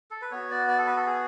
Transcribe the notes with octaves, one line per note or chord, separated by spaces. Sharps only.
A4
B4
B3 F#4 C#5
D5
D5
A4
B4
A4
G#4